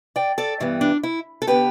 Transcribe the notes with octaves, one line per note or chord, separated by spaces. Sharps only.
D5 G5
A4 D5
G2 E3 G3 B3
D4
E4
A4
D3 B3 G4 B4